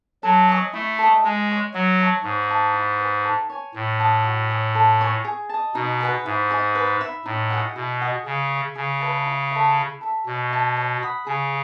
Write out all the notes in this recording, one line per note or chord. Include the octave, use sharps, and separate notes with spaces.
F#3 A4
D#5 G#5 C#6
A3 E4
A4 D#5
G#3 G#4
C#5 G#5
F#3 F#4
C#5 E5 A5
G#2 C#5
E5 A5 D#6
E4
G#4 B4
A4
C#5 G#5
A2 C#5
F#5 A5 D#6
F#4
C#5 G#5 D#6
A4
C#5 G#5
G#4
D#5 A5
B2 D#4
G#4 B4 F#5
G#2 E4
G#4 D#5
B4
E5 B5
A2 D#4
G#4 D#5 F#5
B2 E4
G#4 D#5 F#5
C#3 G#4
C#5 E5
C#3 G#4
B4 E5 A5
E4
A4 C#5 E5
E4
A4 E5
B2 C#5
E5 A5
C#5
F#5 B5 D#6
C#3 G#4